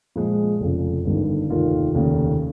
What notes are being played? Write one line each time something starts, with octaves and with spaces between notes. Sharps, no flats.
A#2 F3 G#3
F1 F2 C#3
G1 G2 D#3
F1 D#2 D#3 A#3 F4
F1 D#2 C#3